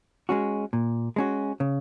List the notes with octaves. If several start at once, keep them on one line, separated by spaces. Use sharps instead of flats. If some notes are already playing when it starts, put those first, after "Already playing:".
G#3 C#4 F#4
A#2
G#3 C#4 F#4
C#3